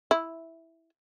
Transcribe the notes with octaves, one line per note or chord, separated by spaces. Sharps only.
E4